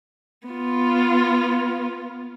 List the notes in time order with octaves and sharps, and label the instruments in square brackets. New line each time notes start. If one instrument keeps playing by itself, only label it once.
[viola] B3 F4